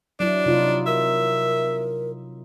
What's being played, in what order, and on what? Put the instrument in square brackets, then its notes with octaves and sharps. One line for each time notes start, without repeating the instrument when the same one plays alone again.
[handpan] F#3 E4 [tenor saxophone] D4
[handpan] C3 D#4 F4
[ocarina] A#4 [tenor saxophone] E5